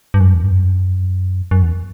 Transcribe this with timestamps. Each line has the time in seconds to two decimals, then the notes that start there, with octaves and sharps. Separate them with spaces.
0.14 G2
0.20 F#2
0.34 E2
0.43 G2
0.50 F#2
1.51 F#2
1.63 E2